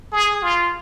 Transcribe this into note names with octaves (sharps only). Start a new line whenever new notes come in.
G#4
F4